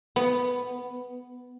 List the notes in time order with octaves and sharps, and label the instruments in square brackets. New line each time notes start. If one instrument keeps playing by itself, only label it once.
[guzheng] B3